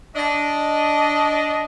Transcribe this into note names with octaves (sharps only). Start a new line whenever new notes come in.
D4 D#5